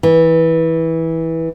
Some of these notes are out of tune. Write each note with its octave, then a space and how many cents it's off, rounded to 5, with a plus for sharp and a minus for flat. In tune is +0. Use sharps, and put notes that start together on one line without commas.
E3 -15